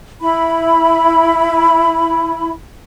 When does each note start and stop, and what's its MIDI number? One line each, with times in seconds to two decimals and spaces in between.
0.21 2.51 64
0.21 2.51 83